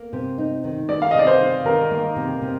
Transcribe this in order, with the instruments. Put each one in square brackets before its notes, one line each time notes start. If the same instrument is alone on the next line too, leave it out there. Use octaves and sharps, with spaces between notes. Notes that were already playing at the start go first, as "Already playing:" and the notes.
Already playing: [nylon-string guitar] A#3
C3
D#4
D#3
[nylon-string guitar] A#3 [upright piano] D5
[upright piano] F5
D#5
[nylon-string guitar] C3 [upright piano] D5
[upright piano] C5
[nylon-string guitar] D#4
[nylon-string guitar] D#3 [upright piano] A#4
[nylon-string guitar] A#3
C3
C3